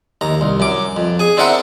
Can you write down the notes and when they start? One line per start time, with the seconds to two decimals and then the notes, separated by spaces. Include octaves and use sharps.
0.21 D#2 A#5
0.41 C2
0.60 F#2 D6
0.97 F2
1.19 G#4 G#5
1.37 C4 D4 E4 A#4 F#5 B5